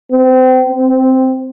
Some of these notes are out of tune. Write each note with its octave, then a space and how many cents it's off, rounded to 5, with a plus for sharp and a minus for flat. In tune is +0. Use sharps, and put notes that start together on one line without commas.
C4 -30
C4 -5